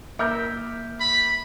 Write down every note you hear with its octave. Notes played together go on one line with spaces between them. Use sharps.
A#3 A#4 E5 D6 F6 G6
B5